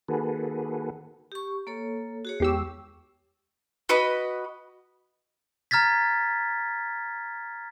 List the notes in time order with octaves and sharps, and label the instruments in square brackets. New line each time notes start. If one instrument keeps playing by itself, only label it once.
[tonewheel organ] D#3 A#3 F#4 G#4 A4 B4
[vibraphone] G4 C#6
A#3 A4 C#5
F#4 G#4 C#5
[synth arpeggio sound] E2 G4 E6 [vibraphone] G#3 C#6
[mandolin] F#4 B4 D#5 B5
[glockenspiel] A#5 F6 G#6 A6 B6